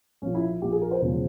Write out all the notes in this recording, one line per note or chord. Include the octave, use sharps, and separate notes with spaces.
A#1 A#2 F3 C#4
E4
A#1 A#2 F3 G4
G#4
A#4
C5
E1 E2 C#3 F3